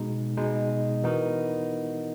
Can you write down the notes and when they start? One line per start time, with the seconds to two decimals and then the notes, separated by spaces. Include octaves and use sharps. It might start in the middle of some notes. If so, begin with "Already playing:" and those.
Already playing: B2 G#3 D#4
0.37 B2 G#3 D#4
1.04 E3 B3 D#4 F#4 A#4